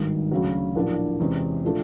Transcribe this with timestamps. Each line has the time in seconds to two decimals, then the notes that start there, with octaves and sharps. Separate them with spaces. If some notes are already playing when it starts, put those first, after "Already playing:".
Already playing: G#1 G2 D#3
0.31 D2 C#3 F#3
0.75 A#1 A2 F#3 A#3 D4
1.19 E2 C3 E3 G#3 C#4
1.64 A#2 F3 A3 D4